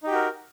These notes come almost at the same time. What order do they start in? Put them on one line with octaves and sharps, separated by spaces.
D#4 G4 F#4 A#4